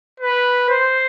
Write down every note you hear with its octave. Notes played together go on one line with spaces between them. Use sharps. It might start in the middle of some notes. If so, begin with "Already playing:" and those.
B4
C5